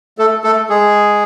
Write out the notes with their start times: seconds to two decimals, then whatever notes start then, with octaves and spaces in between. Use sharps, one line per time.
0.18 A3 A4
0.44 A3 A4
0.69 G#3 G#4